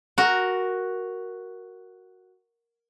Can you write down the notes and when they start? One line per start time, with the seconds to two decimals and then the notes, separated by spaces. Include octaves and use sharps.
0.18 F#4 A#4